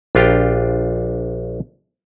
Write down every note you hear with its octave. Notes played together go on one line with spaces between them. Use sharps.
A#1 D4 F4 G4 F5 G5